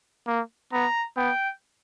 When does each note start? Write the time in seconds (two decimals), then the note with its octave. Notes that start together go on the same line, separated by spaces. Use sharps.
0.27 A#3
0.72 B3 A#5
1.17 B3 G5